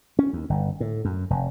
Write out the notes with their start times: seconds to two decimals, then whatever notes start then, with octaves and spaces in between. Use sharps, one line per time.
0.19 C#4
0.33 D#2
0.50 G1
0.80 A2
1.05 F#2
1.30 F1